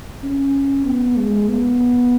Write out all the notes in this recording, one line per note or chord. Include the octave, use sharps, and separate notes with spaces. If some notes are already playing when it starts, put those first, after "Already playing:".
C#4
B3
G#3
B3